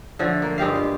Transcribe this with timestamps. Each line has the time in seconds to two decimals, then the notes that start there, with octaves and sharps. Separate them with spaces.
0.19 D3 F3 A3
0.42 A#3
0.58 G2 G#3 G4 F5
0.75 F4